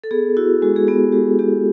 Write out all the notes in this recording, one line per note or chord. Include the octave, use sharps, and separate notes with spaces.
A4
B3 G#4
E4 F#4
G#3 F#4
G#4
B3 G4
G#3 G4
B3 G4